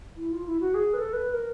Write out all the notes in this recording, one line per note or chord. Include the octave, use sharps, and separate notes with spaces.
E4
F4
E4
F#4
G#4
B4
A4
B4
A#4